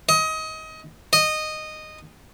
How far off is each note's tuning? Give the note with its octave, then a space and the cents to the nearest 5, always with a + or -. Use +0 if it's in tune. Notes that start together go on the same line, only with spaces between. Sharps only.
D#5 +25
D#5 -10